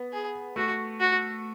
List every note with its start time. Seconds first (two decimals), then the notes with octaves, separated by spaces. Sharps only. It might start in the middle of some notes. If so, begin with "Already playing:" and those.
Already playing: B3
0.13 G#4
0.56 A3 F#4
1.00 F#4